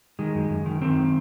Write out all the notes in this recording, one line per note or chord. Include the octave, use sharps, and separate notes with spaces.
D#3 G#3
F#2
F#2
D#3
D#3 C4